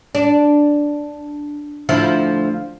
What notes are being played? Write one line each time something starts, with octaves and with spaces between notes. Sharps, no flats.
D4
D2 F3 E4